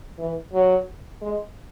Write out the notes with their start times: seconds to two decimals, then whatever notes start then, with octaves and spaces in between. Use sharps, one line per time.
0.18 E3
0.53 F#3
1.21 G#3